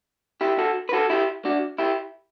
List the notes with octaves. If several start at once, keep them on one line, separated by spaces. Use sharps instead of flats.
E4 G4
F#4 A4
B4
F#4 A4
E4 G4
D4 F#4
E4 G4